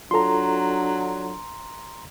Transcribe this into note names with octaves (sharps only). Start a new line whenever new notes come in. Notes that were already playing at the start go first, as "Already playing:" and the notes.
F#3 D4 F4 A4 A#5 C6